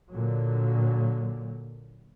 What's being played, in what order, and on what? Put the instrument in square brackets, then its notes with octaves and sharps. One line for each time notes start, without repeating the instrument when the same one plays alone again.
[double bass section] A#2 D3 F#3